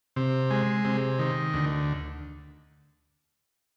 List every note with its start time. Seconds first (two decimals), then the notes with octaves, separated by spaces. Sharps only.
0.16 C3
0.51 G#3
0.85 C3
1.19 D#3
1.54 D2